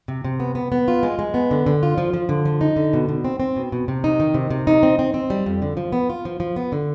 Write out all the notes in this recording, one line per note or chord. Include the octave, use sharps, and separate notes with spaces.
C3
C3
B3
B3
B3
F4
G#3
G#3
B3
D3
D3
F4
F3
F3
D3
F3
D#4
D3
B2
B2
C4
C4
B2
B2
C3
D#4
D#3
C3
C3
D#4
C4
C4
C4
G3
F2
D3
F3
B3
F4
F3
F3
B3
D3